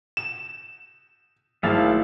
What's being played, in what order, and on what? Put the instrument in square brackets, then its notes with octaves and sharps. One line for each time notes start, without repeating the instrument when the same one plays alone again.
[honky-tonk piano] E7
[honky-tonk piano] G#1 [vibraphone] A3 E4 G#4 [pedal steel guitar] E5 F5 A5